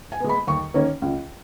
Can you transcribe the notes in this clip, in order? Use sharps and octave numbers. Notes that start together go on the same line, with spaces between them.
G#5
G#3 B3
B5
D#2 C#6
D#3 A#3 C#4
C#2